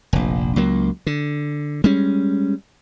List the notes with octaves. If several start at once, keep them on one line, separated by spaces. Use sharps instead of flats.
F1 A#1
C#2 F#3 A#3
D3
G3 G#3 C#4